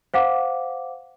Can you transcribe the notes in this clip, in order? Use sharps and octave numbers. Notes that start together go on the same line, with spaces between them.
C5 F5 F#5 D6